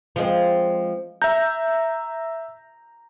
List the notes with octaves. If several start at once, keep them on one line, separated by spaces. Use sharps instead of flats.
F3 G#3 C4
E5 A#5 G6